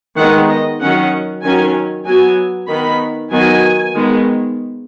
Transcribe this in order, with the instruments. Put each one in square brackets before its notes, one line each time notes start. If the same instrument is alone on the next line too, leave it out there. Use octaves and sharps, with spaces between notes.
[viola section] D#3 G#3 B3 F#5
D#5
D#3 F#3 C#4 F#5
D#3 F#3 C#4 G#5
F#3 B3 G#5
D#3 B3 B5
D#3 F#3 B3 G#5
D#3 G#3 B3